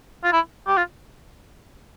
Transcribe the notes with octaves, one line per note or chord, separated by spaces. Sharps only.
F4
E4
G4
F4